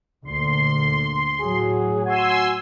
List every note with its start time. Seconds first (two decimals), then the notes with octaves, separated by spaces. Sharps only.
0.25 D2 A#2 D3 C6
1.40 A2 F#3 G#4
2.06 F#4 G#5 C6 E6